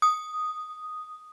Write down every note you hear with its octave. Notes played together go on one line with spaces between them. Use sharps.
D#6